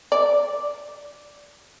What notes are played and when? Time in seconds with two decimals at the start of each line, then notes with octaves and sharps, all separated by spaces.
0.12 D5